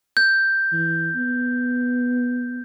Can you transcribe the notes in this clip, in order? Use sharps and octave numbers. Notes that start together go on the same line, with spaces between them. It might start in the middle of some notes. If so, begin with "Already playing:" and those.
G6
E3
B3